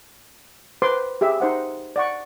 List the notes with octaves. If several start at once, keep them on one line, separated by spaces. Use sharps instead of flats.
B4 C5 C6 D6
G4 G#4 E5
D#4 C5 F#5
D5 F#5 C#6